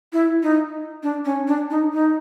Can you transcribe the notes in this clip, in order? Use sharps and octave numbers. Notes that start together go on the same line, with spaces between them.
E4
D#4
D4
C#4
D4
D#4
D#4